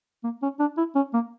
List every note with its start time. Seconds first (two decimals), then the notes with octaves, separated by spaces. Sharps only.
0.24 A#3
0.42 C#4
0.60 D4
0.77 E4
0.95 C#4
1.13 A#3